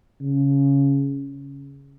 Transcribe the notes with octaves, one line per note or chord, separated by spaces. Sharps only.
C#3